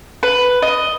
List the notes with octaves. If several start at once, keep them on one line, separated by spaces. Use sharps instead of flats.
B4
D#5